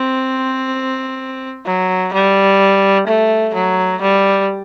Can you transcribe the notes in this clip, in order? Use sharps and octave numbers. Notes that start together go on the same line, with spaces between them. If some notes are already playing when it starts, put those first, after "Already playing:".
Already playing: C4
F#3
G3
A3
F#3
G3